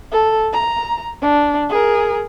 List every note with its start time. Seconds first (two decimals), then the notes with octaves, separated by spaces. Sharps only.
0.12 A4
0.53 A#5
1.22 D4
1.70 G#4 A#4